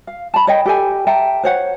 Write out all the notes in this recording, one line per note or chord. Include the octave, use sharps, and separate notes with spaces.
F5
A5 B5
C#5 D#5 G5
G4 A4 G#5
E5 G5 A5 A#5
C5 C#5 F#5